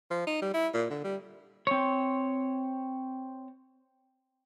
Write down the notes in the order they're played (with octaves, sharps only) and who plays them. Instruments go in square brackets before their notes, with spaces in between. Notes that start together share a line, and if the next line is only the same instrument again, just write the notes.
[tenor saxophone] F3
D#4
G3
E4
A#2
D3
G3
[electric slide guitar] C4 C#5